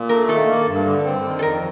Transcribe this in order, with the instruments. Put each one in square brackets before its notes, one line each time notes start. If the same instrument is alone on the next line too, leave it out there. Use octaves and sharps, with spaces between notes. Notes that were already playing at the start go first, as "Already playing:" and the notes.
Already playing: [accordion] A#2
[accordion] A3 [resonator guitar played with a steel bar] A#4
[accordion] D#3 [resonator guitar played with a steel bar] A4
[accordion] A#3
G2
D3
C4
D#3
[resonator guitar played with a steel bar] A4
[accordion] F2 [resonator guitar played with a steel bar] A#4